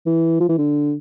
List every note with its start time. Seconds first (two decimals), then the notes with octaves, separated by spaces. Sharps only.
0.06 E3
0.40 F3
0.49 E3
0.58 D3